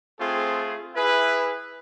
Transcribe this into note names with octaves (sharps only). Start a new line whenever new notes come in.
A3 C4 F4 G#4
E4 G#4 B4 E5